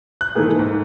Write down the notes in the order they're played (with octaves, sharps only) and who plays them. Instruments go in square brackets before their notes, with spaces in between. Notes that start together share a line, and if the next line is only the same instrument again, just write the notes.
[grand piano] F#6
G#2 D#3 E3 A3 A#3 G#4
G#2